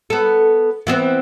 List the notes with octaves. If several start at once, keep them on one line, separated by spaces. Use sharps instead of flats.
B3 A4
E3 B3 C4